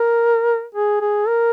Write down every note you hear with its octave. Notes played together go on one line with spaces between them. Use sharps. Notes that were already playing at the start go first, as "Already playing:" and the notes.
Already playing: A#4
G#4
G#4
A#4